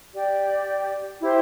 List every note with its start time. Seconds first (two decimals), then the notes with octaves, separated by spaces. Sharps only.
0.13 G4 D5 G5
1.21 E4 G4 C5